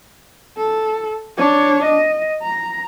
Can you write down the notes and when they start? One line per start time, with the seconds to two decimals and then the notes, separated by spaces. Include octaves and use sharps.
0.57 A4
1.37 D4 C#5
1.84 D#5
2.42 A#5